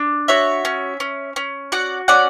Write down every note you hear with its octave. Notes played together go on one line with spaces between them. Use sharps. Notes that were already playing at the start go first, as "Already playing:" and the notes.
Already playing: D4
F#4 C#5 E5
C#4
C#4
C#4
F#4 D5 F#5
C#4 D5 F#5